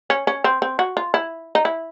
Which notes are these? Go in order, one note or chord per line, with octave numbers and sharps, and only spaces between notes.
C#4
C#4
C4
C4
F#4
F4
E4
D#4
E4